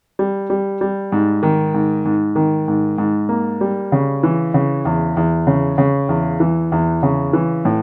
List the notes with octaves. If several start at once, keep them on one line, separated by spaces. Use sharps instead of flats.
G3
G3
G3
G#2
D#3
G#2
G#2
D#3
G#2
G#2
A#3
G3
C#3
E3
C#3
E2
E2
C#3
C#3
E2
E3
E2
C#3
E3
A2